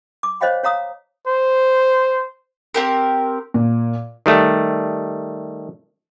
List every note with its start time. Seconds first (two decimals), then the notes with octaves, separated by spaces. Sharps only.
0.23 D6
0.41 C5 C#5 D#5 F5 G5 B5
0.64 C#5 F5 A#5 D#6
1.27 C5
2.74 C4 G4 A#4
3.54 A#2
4.26 D#3 G3 A3